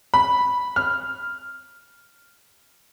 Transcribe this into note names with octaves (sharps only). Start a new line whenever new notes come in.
B5
F6